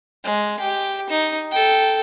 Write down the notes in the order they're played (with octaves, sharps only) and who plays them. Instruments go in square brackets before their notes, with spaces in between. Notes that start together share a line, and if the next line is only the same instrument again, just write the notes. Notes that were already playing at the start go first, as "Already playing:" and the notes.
[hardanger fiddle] G#3
G4
D#4
A4 G5